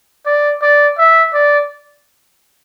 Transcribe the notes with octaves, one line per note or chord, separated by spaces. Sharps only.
D5
D5
E5
D5